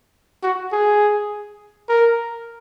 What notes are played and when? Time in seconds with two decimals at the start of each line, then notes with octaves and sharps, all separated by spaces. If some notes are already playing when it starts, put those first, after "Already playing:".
0.43 F#4
0.72 G#4
1.89 A#4